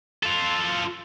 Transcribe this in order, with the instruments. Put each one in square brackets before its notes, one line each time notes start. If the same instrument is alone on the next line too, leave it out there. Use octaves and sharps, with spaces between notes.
[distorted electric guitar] F4 A4